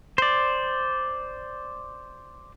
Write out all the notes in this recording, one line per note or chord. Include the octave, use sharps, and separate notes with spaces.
C5 D5